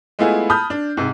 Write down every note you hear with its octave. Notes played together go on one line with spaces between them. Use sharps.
G#3 A3 B3 E4 F4 G#4
A5 B5 D#6 F6 G6
D4
G#2 C3